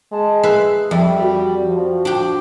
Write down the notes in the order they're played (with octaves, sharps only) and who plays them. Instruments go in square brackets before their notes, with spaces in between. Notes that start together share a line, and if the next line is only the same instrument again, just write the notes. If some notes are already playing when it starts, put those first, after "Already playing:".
[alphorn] G#3 [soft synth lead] A5
[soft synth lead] G#4 [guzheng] B4 E5 F5
[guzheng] F2 [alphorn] G3 [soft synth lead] E5
[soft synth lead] F#4
[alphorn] F3
[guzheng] D4 G4